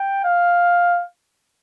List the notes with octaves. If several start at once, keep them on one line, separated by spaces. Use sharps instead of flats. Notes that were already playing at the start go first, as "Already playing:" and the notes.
Already playing: G5
F5